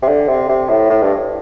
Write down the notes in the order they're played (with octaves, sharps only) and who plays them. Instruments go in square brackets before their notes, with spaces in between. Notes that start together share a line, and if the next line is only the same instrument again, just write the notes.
[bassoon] C3
D3
C3
C3
A2
A2
G2